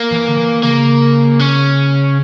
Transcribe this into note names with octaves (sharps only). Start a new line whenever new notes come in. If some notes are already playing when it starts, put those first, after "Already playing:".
Already playing: A#3
E3
D3
E3
C#3 A#3
C#4